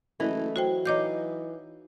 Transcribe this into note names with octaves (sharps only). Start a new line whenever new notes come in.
F#1 E3 A3 E4 D#5
F#3 F#4 C5 G5
E3 D#4 C#5 D#5 F5 D6 G6